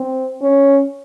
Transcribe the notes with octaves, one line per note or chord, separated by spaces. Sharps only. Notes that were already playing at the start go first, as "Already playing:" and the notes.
Already playing: C4
C#4